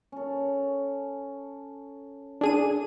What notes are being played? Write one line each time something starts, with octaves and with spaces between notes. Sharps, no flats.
C#4 A4
D4 G#4 A4 G#5 D#7